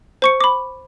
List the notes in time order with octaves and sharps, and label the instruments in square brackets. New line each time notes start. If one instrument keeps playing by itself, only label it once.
[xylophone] C5 C#6 C#7
B5 D6